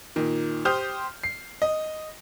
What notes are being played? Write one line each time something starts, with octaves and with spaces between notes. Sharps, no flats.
A#2 D#3
G4 C5 C6 D#6 F6 G6
C7
D#5